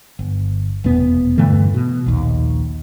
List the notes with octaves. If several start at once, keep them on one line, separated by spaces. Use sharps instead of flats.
G1
F1 E2 B2 B3
G2 D3 E3 A3
B2
A#1 D#2